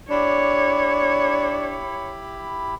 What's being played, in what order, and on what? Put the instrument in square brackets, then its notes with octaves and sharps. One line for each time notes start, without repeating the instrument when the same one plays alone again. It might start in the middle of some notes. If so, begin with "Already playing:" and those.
[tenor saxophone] D4 [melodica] E4 G4 B5 [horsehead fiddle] C#5